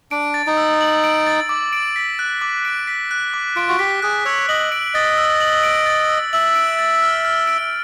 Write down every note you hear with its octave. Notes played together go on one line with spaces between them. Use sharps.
D4 D7
A6
D#4
E6
F#7
D7
A6
D6
D7
B6
F#6
D6
D7
B6
F#6
D6
F4 D7
F#4
G4 B6
G#4 F#6
C#5 E6
D#5 F#7
D7
D#5 A6
E6
F#7
D7
A6
E6
E5 F#7
D7
A6
F6
F6
D7